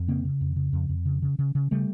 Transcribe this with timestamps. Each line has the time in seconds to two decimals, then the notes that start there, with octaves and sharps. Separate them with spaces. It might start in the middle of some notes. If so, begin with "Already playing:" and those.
Already playing: F2
0.08 C#3 A#3 C4
0.25 C#3
0.41 F2
0.56 C#3
0.73 F2
0.89 F2
1.05 C#3
1.22 C#3
1.39 C#3
1.55 C#3
1.71 C#3 G3 A3